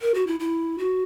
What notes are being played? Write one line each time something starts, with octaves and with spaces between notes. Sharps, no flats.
A#4
F#4
E4
E4
F#4